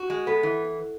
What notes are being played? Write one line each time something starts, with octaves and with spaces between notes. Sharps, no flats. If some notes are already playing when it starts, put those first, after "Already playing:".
Already playing: F#4
G#3
B3 A4
E3